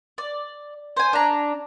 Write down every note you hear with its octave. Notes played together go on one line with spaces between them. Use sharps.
D5
C5 G#5
D4 A#5